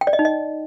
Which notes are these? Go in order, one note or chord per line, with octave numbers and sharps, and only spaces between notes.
G5
D5
D#5
D#4
D#5